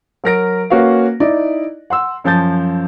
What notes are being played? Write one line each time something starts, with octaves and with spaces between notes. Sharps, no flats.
F#3 A#4 A#6 D7
A#3 C#4 F#4 B4 F5
D#4 E4 D5 D#5
F#5 C6 E6
F#2 F3 A5 G6 A6